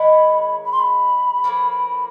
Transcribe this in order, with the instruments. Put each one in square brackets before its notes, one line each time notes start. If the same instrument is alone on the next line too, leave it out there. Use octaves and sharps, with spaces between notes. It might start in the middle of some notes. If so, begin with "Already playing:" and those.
Already playing: [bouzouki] D#3 G#3 C#4 E4 [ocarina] B5
[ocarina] B5
C6
B5
[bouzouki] A2 F3 A#3